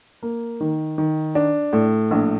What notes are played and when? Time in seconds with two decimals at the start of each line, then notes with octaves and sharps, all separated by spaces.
0.23 A#3
0.60 D#3
0.98 D#3
1.35 D4
1.73 A2
2.11 A#1